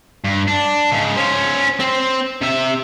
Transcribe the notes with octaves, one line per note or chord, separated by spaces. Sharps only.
G2
D4
G#2 C#3
C#4 C5
C4 C5
C3 E5